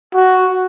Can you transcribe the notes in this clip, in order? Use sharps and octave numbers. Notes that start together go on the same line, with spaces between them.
F#4